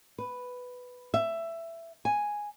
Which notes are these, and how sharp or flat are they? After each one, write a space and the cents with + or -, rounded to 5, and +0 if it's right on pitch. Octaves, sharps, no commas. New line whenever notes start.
B4 +5
E5 +15
G#5 +0